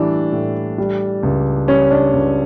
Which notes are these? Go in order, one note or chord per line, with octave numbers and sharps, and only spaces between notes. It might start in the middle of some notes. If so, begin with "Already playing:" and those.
Already playing: A2 E3 G3 D4
A2
G3
C#2
G3 C#4
D4
C#2